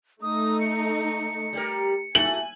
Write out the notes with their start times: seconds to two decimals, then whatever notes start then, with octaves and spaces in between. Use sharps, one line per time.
0.22 A3 D#4 D#6
0.61 C#7
1.53 G3 G4 A#4
2.15 E4 F#4 A4 G#5 F#7